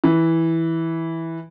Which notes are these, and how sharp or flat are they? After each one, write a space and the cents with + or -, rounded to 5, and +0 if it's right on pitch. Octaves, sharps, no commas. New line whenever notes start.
E3 -10